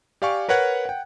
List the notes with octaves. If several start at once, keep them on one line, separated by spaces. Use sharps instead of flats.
G4 D5 F5 G#5 C#6
A#4 B4 C#5 F#5 F#6 G#6
F#5 G5